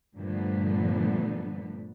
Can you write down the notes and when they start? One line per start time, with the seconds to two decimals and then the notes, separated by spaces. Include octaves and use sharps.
0.18 G2 A#2 D3 F3 A3 B3